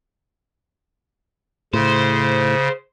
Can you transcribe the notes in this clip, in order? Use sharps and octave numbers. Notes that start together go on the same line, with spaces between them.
A2 C#3 C5